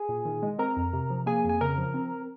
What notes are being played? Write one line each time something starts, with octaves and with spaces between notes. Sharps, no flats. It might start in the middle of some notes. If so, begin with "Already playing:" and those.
Already playing: G#4 G#5
A#2
D#3
G#3
C4 A#4 A#5
F2
C3
F3
A#3 G#4 G#5
F2
G#5
C#3 A#4 A#5
F3
C4